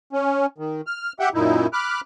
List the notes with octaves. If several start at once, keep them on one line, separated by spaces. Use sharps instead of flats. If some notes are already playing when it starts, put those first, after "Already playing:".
C#4
D#3
F6
G4 E5 F#5 G5
F#2 A#2 D#4 E4
B5 D6 F6 F#6